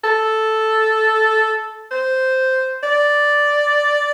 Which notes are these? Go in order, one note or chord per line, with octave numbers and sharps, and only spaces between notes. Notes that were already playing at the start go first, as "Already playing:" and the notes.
A4
C5
D5